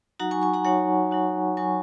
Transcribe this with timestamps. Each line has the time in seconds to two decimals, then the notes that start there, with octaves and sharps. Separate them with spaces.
0.19 F#3 D#4 F#4 F#5 A#5
0.31 G#5 C#6
0.42 G#5 C#6
0.54 F#5 A#5
0.65 F#3 D#4 F#4 C#5 F#5
1.11 F#3 D#4 F#4
1.57 F#3 D#4 F#4 G#5 C#6